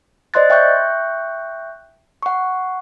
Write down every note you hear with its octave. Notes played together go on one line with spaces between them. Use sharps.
C5 D5 D#5 C6 F#6 A6
E5 G5 C#6 F#6 G6
F#5 C#6